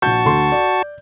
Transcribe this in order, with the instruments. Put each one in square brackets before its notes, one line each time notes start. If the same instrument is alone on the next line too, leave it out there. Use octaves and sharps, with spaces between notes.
[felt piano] A#1 G6 [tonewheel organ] F#4 A5 C#6
[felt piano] D2 A4 C6
D5